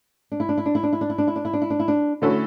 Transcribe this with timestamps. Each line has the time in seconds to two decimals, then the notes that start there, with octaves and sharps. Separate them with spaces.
0.32 D4
0.40 E4
0.49 D4
0.58 E4
0.66 D4
0.75 E4
0.83 D4
0.93 E4
1.01 D4
1.10 E4
1.18 D4
1.28 E4
1.36 D4
1.45 E4
1.53 D4
1.62 E4
1.70 D4
1.80 E4
1.88 D4
2.22 D3 A3 C#4 E4 F#4 A4